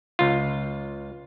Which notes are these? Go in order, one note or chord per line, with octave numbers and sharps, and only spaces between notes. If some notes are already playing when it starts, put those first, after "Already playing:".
C#2 F4